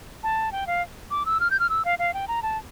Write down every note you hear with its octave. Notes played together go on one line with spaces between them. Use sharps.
A5
G5
F5
D6
E6
F6
G6
F6
E6
F5
F5
G5
A#5
A5